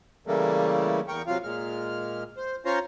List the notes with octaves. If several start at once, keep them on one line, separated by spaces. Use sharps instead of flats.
C#3 E3 G3 A3 A#3
E2 A#4 G5 C#6
C3 F#3 F4 F5
A#2 G#3 F6
C5
C#4 F4 C5 C#5 A#5 C6